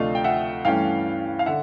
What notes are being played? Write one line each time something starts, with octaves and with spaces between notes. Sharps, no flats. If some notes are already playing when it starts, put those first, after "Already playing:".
Already playing: D2 C3 F3 A3 D4 D#5 F5
G5
E5 F#5
G2 E3 A3 C#4 F5 G5
F5
D3 E5 F#5